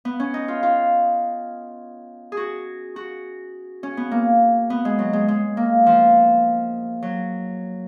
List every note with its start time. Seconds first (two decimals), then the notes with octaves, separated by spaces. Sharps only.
0.05 B3
0.20 C#4
0.34 D#4
0.48 F4
0.63 F4
2.32 G#4
2.37 F#4
2.96 F#4
3.83 C#4
3.97 B3
4.11 A#3
4.70 B3
4.85 G#3
4.99 F#3
5.13 G#3
5.28 G#3
5.57 A#3
5.86 F3
7.02 F#3